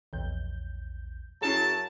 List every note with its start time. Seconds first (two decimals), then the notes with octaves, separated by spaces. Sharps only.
0.13 A#1 E2 G6
1.42 F#2 F#3 C#4 E4 G#4 A5